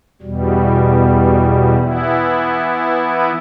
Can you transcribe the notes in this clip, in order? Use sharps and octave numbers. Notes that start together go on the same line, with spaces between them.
E2 B2 G3
E3 B3 E4